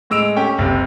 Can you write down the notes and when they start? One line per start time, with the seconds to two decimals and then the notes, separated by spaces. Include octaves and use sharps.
0.10 A2 G#3 E6 D7 F7
0.36 A3 C#4 G4 G5
0.58 F#1 C3